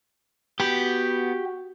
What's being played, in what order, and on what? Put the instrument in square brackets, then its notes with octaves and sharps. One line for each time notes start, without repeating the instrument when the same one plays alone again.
[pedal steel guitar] B3 B5 [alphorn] F#4 [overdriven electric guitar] G4